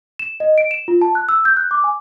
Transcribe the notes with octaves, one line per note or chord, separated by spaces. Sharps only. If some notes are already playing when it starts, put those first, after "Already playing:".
E7
D#5
D7
E7
F4
A5
F#6
E6
G6
F#6
D6
G#5